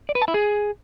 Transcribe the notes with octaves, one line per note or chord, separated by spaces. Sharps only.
D5
B4
A5
E4
G#4